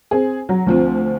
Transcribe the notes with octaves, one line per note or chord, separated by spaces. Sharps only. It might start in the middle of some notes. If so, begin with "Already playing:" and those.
C4 G#4
F#3
D2 F3 C4